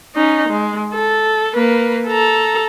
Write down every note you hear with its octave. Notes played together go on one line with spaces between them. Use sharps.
C#4 D#4
G#3
A4
A#3 B4
A4 A#5